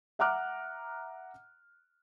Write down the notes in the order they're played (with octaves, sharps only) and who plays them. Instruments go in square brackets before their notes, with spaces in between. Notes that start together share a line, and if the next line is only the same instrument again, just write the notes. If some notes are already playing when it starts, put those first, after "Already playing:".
[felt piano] E5 F#5 A#5 D6 F6 F#6